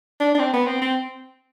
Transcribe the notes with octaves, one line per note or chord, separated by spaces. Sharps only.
D4
D4
C4
B3
C4
C4